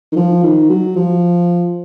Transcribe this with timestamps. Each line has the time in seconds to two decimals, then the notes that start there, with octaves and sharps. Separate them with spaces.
0.12 D#3
0.16 F3
0.43 D#3
0.69 F#3
0.96 F3